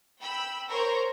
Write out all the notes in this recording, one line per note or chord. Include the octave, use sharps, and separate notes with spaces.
G5 B5 E6
A#4 C5 C#5 A#5